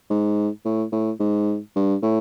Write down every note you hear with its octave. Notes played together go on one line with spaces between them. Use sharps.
G#2
A2
A2
G#2
G2
A2